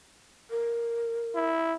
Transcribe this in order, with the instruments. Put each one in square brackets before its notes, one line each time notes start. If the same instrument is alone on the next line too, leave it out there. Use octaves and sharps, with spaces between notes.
[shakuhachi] A#4
[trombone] E4